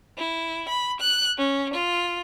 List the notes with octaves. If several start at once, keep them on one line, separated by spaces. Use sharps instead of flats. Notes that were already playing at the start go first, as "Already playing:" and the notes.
E4
B5
F#6
C#4
F4